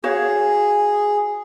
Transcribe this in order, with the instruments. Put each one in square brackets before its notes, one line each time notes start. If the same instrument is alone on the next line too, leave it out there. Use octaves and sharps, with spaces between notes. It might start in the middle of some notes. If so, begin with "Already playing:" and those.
[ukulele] F#4 C#5 F5 [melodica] G#4